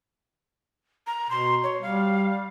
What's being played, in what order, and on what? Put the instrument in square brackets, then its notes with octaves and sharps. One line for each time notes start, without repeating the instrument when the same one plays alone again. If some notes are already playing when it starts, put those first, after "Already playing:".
[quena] A#5
[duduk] B2 [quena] C6
[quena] C#5
[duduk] G3 [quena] F5